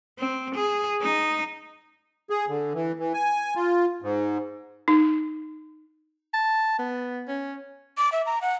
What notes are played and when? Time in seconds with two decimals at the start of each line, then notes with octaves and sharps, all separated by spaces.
0.19 C4
0.55 G#4
1.01 D#4
2.30 G#4
2.49 D3
2.74 E3
2.99 E3
3.14 G#5
3.55 F4
4.02 G#2
4.88 D#4
6.34 A5
6.79 B3
7.28 C#4
7.98 D6
8.12 E5
8.26 A#5
8.42 F#5